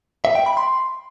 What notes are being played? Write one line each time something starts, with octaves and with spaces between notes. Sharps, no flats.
E5
G5
B5
C6